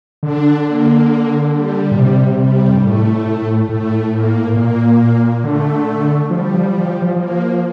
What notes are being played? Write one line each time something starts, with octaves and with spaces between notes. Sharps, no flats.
D3 D4
A#3
G3
A#2
C3
G3
F2
G2
A2 A3
A2 A3
A#3
A#2 A#3
D3 A3
F3 G3
F3
F3
F3
F3 A#3